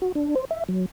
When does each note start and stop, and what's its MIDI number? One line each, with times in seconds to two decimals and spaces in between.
0.02 0.12 66
0.15 0.35 62
0.36 0.45 72
0.51 0.64 76
0.69 0.86 54